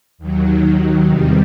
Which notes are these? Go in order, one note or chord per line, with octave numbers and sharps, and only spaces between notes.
D#2 D#3 F#3
E2 C3 D#3 G3